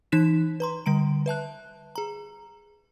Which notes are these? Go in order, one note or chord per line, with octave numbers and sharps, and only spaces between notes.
E3 D#4 F#6 B6 E7
B4 A#5 C6
D3 G3 A#5 D7
B4 E5 A5 F#6
G#4 A#5